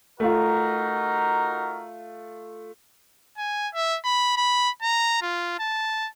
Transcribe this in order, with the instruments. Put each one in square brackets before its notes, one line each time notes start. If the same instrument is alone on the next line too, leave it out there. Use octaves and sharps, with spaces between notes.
[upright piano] A3 F4 [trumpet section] D#4 F#4 A#4
[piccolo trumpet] G#5
E5
B5
B5
A#5
F4
A5